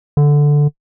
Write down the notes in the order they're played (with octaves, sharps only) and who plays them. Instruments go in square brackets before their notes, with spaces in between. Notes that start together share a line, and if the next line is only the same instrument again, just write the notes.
[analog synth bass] D3